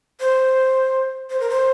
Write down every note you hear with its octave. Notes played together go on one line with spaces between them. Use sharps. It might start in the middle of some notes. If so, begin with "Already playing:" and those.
C5
C5
A#4
C5